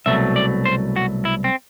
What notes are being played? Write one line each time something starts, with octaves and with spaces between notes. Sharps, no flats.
C2 B2 F#3 A3 E5
D5
C5
F#4
E4
C4